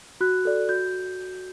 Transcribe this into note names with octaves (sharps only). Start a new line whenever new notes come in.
F#4 F#6
A4 D5
F#4 G6